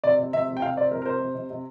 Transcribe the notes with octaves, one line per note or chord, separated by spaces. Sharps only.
C3 D5
C3
C3 E5
C3
G5
C3 F5
C4 D5
C3 A#4
A#4
C4 C5
C3
C3
C3